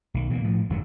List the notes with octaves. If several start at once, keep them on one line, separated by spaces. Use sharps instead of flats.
B1 D#3
B2 E3 G3 A#3
A2 F3
G1 F#2 D#3 F#3